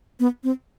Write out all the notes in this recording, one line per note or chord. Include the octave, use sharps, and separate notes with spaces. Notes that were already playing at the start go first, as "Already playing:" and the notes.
B3
C4